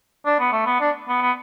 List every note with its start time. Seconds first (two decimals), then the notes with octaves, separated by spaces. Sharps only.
0.25 D4
0.40 B3
0.52 A3
0.66 B3
0.80 D4
1.08 B3
1.22 B3